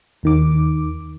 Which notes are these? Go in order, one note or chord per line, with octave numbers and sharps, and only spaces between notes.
D#2 D#3 D6